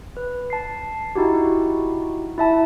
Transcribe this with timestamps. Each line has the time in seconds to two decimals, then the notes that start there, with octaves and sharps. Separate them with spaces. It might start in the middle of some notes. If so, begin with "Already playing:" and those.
0.17 B4
0.50 A5 C7
1.15 D#4 E4 F#4 G4
2.38 E4 E5 A5